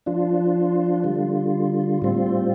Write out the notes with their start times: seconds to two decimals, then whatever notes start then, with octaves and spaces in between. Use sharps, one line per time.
0.06 F3 D4 F4
1.04 D3 G3 F4
2.02 A2 G3 C4 F4